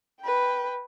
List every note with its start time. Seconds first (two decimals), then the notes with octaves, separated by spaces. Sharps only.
0.21 B4 G5